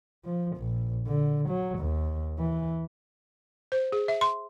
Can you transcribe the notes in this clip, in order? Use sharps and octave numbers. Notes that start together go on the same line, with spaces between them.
F3
A#1
D3
F#3
D#2
E3
C5
G#4
E5
C6